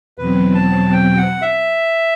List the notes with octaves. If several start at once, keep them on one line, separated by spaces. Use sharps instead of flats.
E2 B2 F#3 C4 B4
A5
G5
F#5
E5